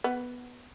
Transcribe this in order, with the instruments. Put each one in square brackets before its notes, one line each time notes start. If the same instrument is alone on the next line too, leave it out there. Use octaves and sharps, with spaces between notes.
[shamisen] B3